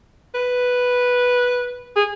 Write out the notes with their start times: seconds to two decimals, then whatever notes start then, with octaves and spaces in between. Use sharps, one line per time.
0.35 B4
1.96 G#4